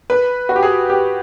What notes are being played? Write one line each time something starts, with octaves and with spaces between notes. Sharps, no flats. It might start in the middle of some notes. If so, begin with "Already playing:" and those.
B4
F#4
G4
G#4
G4